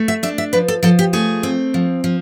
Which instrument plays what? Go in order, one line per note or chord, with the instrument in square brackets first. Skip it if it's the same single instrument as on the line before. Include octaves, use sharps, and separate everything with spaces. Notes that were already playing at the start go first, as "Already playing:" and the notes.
Already playing: [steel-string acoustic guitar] A3
E5
D4 E5
E5
F3 B4
A4
F3 A4
G4
A3 G#4
C4
F3
F3